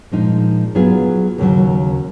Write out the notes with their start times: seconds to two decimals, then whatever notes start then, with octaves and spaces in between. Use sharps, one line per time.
0.11 A#2 F3 G#3 D#4
0.75 F#3 B3 F4 G#4
1.38 D#2 C#3 F#3